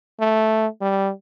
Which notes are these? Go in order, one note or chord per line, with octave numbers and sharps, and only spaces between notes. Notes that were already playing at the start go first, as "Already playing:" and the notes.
A3
G3